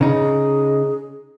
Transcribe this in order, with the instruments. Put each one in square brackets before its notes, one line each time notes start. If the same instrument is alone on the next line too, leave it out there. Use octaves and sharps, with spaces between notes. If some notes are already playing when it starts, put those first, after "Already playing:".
[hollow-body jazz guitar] C#3 D#4 [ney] G#4